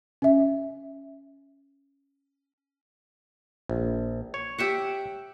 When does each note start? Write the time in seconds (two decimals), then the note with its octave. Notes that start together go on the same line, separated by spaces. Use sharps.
0.22 C#4 E5
3.69 A#1
4.34 C#5
4.58 G4 E5 F#5